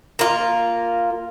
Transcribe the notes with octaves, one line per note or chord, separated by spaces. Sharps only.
A#3 F4